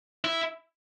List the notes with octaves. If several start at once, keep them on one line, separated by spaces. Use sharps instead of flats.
E4